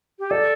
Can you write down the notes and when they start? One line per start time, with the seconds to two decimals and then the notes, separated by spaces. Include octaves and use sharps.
0.19 G4
0.31 A4 D5